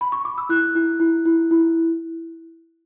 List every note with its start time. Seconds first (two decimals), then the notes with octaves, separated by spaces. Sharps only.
0.01 B5
0.12 C#6
0.25 D6
0.38 E6
0.49 E4 F#6
0.75 E4
1.00 E4
1.25 E4
1.51 E4